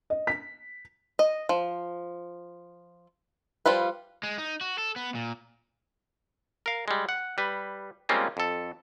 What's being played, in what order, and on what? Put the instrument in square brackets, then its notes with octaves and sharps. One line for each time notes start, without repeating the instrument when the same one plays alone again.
[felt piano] D#5
B6
[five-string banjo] D#5
F3
F3 G3 F4 B4
[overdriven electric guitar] G#3
D#4
F#4
A4
B3
A#2
[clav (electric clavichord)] A#4 F5
G3 G#3
F#5
G3 B4
G3 G#3 A#3 C4 C#4 F4
F2 A4